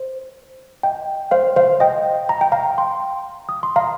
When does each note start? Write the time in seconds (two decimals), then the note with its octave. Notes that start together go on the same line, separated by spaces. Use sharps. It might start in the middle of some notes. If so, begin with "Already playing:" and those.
Already playing: C5
0.83 D#5 G5
1.31 C5 F5
1.56 C5 F5
1.80 D#5 G5
2.29 A#5
2.41 G5
2.52 F5 A#5
2.78 G5 C6
3.49 D#6
3.63 C6
3.76 F5 A#5